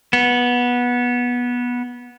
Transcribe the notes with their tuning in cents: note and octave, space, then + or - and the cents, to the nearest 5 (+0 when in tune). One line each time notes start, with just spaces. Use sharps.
B3 -15